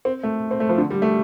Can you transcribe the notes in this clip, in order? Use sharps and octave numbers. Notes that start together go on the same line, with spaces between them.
C4
A3
C4
A3
F3
D3
G3
A3